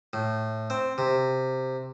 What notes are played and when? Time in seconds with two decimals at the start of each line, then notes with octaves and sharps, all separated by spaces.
0.13 A2
0.70 C4
0.98 C3